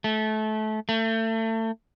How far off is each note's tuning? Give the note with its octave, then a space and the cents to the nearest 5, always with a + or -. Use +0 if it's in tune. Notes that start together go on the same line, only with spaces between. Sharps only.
A3 -25
A3 +30